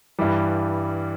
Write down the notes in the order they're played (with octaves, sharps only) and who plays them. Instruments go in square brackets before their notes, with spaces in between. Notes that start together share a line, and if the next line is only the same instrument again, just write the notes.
[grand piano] G2 E3 G3